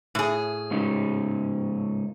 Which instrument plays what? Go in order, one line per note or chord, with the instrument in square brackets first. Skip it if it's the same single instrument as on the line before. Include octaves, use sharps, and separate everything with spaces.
[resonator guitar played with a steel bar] A2 G#4
[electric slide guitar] G#2 C#3 D#4